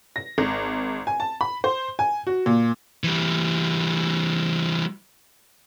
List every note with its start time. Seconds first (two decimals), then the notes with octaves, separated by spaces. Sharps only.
0.16 A#6
0.38 G#1
1.07 G#5
1.20 A5
1.41 B5
1.64 C5
1.99 G#5
2.27 F#4
2.46 A#2
3.04 E3 G3